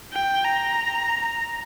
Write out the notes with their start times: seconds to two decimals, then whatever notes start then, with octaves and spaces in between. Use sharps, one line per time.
0.13 G5
0.43 A#5